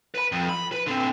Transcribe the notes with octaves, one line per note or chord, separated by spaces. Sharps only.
B4 B5
F2
B5
B4
D3 C4